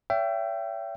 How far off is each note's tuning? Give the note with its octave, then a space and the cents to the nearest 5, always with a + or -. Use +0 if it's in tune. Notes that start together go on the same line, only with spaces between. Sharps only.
C#5 +35 E5 +30 G5 -10